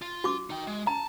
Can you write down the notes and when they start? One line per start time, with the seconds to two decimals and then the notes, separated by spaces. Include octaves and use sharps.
0.02 F4
0.24 F#4 D6
0.50 D#4 G5
0.67 G#3
0.87 A5 A#5